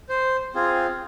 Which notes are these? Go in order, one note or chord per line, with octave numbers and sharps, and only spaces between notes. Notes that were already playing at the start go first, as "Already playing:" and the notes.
C5
C4 F4 G#4